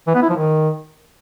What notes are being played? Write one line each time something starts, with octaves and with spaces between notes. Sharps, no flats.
E3
B3
E4
F3
D#3